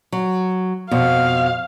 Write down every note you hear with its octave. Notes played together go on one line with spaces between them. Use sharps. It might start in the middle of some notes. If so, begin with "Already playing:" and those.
F#3
F2 B2 F5